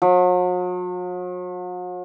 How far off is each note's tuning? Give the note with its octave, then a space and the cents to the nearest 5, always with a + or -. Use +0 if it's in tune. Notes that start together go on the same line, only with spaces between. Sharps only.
F#3 -45